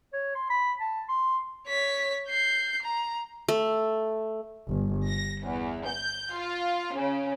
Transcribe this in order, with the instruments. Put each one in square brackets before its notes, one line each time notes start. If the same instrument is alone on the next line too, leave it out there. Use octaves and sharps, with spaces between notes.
[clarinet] C#5
C6
B5
A5
C6
[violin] C#5 B6
G6 C7
A#5
[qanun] A3
[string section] G1
A#6
E2
G6
F4
C#3